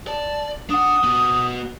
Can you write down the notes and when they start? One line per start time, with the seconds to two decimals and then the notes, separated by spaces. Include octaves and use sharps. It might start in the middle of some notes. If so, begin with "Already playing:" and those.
0.07 D5 A5
0.70 D4 F#5 D#6
1.04 B3 F#4